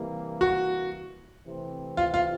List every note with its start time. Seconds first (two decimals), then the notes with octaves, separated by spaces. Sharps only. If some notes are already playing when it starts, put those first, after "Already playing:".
Already playing: C3 E3 G3 A#3
0.41 F#4
1.44 C3 E3 A3 C4
1.97 F4
2.14 F4